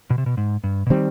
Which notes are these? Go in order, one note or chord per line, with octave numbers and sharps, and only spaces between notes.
B2
C3
B2
G#2
G2
B2
D#3 G3 C4